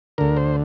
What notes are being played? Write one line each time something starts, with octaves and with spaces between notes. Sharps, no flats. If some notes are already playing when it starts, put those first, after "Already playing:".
D2 D3 A#4
C5